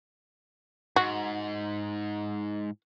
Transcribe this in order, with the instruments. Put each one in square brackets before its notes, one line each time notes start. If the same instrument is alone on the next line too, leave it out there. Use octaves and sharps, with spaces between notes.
[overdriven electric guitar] G#2 [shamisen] F#4